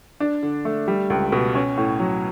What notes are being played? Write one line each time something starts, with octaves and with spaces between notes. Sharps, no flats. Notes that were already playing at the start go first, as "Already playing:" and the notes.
D4
D3
A3
G3
C#2
B2
C#4
A2
F#3